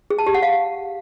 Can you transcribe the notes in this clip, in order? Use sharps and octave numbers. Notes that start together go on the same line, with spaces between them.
G#4
A5
G4
F#5
F5